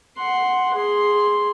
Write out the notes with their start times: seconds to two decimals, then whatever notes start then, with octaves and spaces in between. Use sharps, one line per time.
0.17 F#5 C6
0.74 G#4 C6